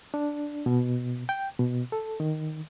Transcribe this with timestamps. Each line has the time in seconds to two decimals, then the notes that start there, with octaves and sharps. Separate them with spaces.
0.14 D4
0.66 B2
1.29 G5
1.59 B2
1.92 A4
2.20 D#3